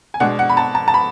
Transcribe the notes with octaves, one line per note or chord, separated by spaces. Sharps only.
G#5
B2 G#3 D4 F#5
F#5
B5
A5
A5
A5
B5